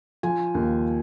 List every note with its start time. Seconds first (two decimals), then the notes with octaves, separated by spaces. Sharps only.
0.23 F3 G#5
0.55 D#2